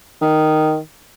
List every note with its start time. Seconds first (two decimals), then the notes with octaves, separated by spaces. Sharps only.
0.22 D#3